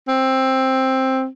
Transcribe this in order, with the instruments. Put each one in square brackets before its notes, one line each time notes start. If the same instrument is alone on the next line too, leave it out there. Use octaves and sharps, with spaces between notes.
[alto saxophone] C4